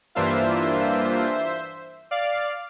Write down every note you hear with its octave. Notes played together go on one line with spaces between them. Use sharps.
G2 E3 A#3 D4 F4 C5 E5
D5 F5